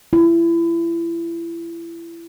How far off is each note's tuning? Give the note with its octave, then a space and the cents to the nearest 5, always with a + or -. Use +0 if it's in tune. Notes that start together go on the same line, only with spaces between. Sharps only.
E4 +30